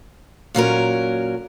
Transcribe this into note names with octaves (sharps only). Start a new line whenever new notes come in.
A#2 F#3 C#4 A#4